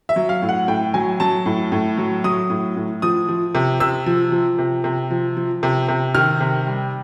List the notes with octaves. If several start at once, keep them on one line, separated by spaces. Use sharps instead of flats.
E5
F#3
F5
A2
F#5
A2 G5
F#3 G#5
F#3 A5
A2
A2
F#3
F#3 D#6
A2
A2
F3 D#6
F3
C3
C3 E6
F3
F3
C3
C3
F3
F3
C3
C3
D#3 F6
C3
G3